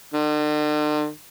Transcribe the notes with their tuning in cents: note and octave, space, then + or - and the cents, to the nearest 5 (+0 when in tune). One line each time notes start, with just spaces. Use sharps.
D3 +45